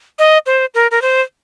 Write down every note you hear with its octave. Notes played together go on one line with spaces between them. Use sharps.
D#5
C5
A#4
A#4
C5